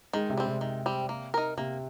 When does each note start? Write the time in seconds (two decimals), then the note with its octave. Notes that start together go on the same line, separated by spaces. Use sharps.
0.13 D#3 G#3
0.30 C3
0.37 G3 C4
0.46 C3
0.61 D#3
0.86 G3 C4
1.09 A#3
1.34 D#4 A#4
1.57 C3 A#3